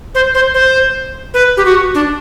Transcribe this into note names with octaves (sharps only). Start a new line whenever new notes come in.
C5
C5
C5
B4
G4
F#4
D4